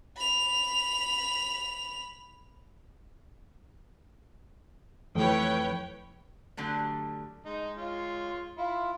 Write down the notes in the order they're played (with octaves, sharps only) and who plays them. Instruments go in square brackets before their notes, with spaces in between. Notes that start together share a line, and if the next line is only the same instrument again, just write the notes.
[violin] B5 F7
[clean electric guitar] F2 [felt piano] E3 A3 [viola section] B4 C#5 G5
[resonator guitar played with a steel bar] D3 F#3 G3 A3
[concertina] G#3 [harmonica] D#4
[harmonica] F4 C#5
[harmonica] E4 [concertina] F4